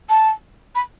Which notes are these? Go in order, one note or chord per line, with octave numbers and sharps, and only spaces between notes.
A5
B5